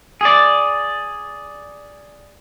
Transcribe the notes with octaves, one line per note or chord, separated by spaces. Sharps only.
G#4 D5